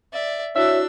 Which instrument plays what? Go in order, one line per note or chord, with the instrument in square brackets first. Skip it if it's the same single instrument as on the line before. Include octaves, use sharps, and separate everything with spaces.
[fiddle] D5 E5
[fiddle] D4 E6 [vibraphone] E4 F#4 [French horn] C#5 [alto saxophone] E5